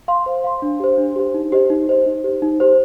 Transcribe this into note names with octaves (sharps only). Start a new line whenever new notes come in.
F5 C6
C5
F5 C6
D4
G4 C5
D4
G4 C5
D#4
G4 C5 D#5
D#4
G4 C5 D#5
D#4
G4 C5
D#4
G4 C5